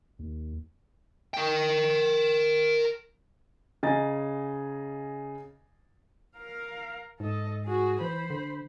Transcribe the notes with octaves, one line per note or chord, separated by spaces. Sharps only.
D#2
A#4 G5
C#3 D#5 G#5 A#5 A6
A#4 F5
G#2 A4 D#5
F#4 G#4
E3 C5 B5
D3